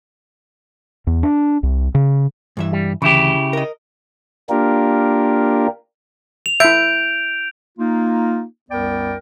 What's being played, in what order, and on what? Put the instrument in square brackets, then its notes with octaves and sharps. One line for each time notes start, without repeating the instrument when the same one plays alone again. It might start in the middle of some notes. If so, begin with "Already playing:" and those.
[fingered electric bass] E2
D4
C2
C#3
[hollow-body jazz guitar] G2 E3 E5
[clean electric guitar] G3
[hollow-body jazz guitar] D2 E3 [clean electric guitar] C#3 E4 G4
[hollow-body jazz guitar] A#4 D#5
[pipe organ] A#3 D4 F4 G4 A#4
[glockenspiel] F7
[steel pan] E4 E5 [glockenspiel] G6 D7
[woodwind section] A#3 D#4 F4
C2 F#2 B3 A#4 D5 G5